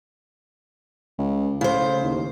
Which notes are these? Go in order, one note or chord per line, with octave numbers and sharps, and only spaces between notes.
C#2
A2 C#3 C5
D#2